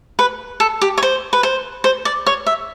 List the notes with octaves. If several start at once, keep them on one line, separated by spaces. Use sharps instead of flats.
B4
A4
G4
C#5
C5
B4
C5
C5
D5
C#5
E5